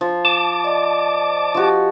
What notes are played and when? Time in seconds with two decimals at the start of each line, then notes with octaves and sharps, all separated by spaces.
0.01 F3
0.25 A5 D6
0.64 D5 D#5
1.55 F3 F#4 G4 D#5